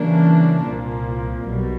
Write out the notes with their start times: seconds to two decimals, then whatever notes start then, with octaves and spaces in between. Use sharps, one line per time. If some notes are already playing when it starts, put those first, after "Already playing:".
Already playing: C#3 E3 G3 A#3 D4
0.64 C2 A#2 F3 A#3
1.47 B1 B2 G3